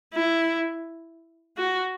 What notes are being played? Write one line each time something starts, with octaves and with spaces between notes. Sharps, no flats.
E4
F#4